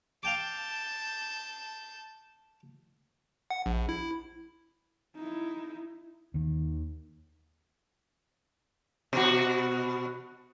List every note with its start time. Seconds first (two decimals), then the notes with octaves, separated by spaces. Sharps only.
0.23 F5 G5 A5 D6 G6
3.50 F#5
3.66 A#1
3.89 E4
5.16 D#4 E4
6.34 D#2 D#3
9.13 B2 F#4